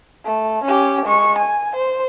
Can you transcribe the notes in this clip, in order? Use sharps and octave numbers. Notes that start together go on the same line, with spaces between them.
A3
C#4 G4
G#3 C#6
G#5
C5